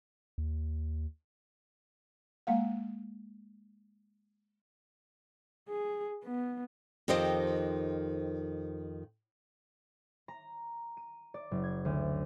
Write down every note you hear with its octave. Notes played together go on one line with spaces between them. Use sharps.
D#2
G#3 A#3 F5 F#5
G#4
B3
F2 D#3 G4 C5 D#5 G5
A#5
D#7
D5
F#1
G#6
D2